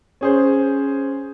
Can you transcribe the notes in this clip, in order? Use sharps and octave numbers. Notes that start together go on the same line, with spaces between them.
C#4 G#4 C5